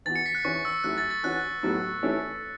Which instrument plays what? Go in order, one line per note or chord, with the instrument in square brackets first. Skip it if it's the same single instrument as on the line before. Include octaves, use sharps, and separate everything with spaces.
[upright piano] E2 E3 B3 F#4 [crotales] A6
[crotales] C#7
B6
F#6
[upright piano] E2 E3 C#4 E4 [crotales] C#6
[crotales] E6
[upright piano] F#2 F#3 A3 E4 [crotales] F#6
[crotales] A6
A6
[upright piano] E3 C#4 F#4 [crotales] F#6
[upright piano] A2 F#3 B3 A4
E3 A3 C#4 E4 A4